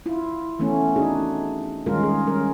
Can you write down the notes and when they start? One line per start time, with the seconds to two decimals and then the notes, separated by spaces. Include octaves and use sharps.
0.06 E4 F4
0.59 E3 A3 B3 C#4
0.96 D4 D#4 F#4 G#4
1.86 D#3 G3 G#3 C#4 F4 A#4
2.03 G#4
2.26 G3 C#4 A#4